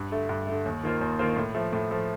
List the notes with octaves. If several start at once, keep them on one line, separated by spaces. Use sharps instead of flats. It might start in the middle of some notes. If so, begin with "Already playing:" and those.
Already playing: G2
D3 A3
G2
D3 A3
D#2
D#3 A#3 F4 C5
D#2
D#3 A#3 F4 C5
A2
F3 A3
A2
F3 A3